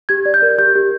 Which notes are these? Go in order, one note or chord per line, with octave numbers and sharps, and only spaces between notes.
G4 G#6
D5
G6
A#4
G4 G6
G4